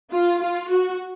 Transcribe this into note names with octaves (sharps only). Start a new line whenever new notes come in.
F4
F4
F#4